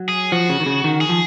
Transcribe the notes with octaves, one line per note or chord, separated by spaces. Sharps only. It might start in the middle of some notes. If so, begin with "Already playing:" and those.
Already playing: F#3
G#4
F3 F#4
C#3
D#3
C#3
D#3
G#4
F3